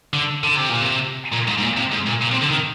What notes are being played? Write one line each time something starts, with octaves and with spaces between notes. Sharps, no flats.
D3
D3
C3
A#2
C3
A#2
G#2
G#2
A#2
C3
G#2
A#2
A#2
C3
D3
D#3